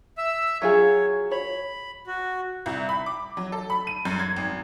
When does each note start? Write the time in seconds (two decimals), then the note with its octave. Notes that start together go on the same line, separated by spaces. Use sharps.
0.18 E5 E6
0.62 F#3 F4 G#4 C#5
1.31 C#5 B5
2.07 F#4
2.66 C2
2.89 B5
3.06 D6
3.37 F#3
3.52 A4
3.70 B5
3.87 D#7
4.05 F#2
4.19 G#6
4.36 G#1